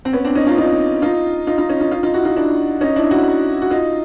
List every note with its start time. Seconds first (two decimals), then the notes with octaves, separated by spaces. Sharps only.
0.05 C4
0.13 B3 C#4
0.24 C4 D4
0.35 C#4 D#4
0.47 D#4 F4
0.58 D#4 F4
1.02 D#4 F4
1.47 D#4 F4
1.58 D#4 F4
1.69 C#4 D#4
1.80 D#4 F4
1.91 D#4 F4
2.03 D#4 F4
2.14 E4 F#4
2.25 D#4 F4
2.36 D4 E4
2.81 C#4 D#4
2.96 D4 E4
3.11 E4 F#4
3.62 F#4
3.71 D#4 F4